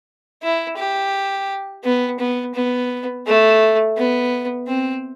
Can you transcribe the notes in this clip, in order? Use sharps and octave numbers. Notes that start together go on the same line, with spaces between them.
E4
G4
B3
B3
B3
A3
B3
C4